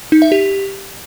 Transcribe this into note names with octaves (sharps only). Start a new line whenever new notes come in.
D#4
E5
G4